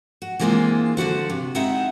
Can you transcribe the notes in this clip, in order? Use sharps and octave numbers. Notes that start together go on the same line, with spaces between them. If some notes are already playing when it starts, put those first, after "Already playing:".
F#4
E3 G#3 A#3 C4 D4 F4
D3 F3 F#4 C5
C3
G#3 C4 D#4 E4 E5 F#5